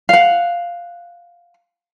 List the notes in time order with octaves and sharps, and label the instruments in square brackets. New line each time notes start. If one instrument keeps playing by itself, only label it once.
[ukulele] F5 F#5